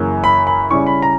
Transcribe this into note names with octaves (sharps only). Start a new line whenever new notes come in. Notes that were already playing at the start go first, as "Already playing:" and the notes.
Already playing: F#2 C#3 E3 A#3
B5
B5
C#3 G3 C#4 E4 C#6
B5
A#5